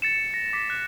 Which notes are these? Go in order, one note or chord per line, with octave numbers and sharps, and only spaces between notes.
A6 C#7 E7
A#6
D6 B6
F#6